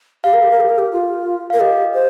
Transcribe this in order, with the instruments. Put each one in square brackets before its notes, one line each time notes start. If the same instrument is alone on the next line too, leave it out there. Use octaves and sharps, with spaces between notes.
[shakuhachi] G4 [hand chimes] F5
[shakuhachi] A#4
G4
A#4
G4
A#4
G4
F4
[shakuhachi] A#4 [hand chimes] F5
[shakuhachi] G4 [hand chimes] D#5
[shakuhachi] C5